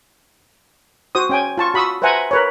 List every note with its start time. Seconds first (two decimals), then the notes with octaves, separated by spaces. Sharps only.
1.15 F#4 C5 D#6
1.30 C#4 G5 G#5
1.58 F4 A5 C#6
1.74 F#4 B5 C#6 D#6 E6
2.02 B4 C5 E5 F#5 G#5 A#5
2.31 A#4 B4 C#5